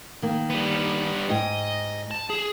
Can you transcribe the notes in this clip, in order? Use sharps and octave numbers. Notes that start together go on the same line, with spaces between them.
D#3 A#3
G3 B3
G#2 D#5 G5
A5
G#4